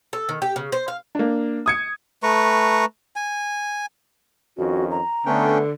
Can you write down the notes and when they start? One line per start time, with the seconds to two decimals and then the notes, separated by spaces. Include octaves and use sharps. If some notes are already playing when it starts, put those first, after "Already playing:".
0.13 A4
0.29 D#3
0.42 G4
0.56 C#3
0.72 C5
0.88 F5
1.15 A#3 D4
1.66 D#6 G#6 C#7
2.23 A3 B4 A#5 C#6
3.16 G#5
4.57 F2 D#3 C#4 F#4
4.91 A#5
5.26 D3 A3 B3 C#4 D4 G5